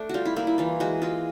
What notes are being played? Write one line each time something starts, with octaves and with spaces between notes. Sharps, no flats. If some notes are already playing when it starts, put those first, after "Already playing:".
Already playing: A3 D4
G3 F4 F#4
E4
A#3 E4
E4
E3 F4
G#3 F#4
G#3 F4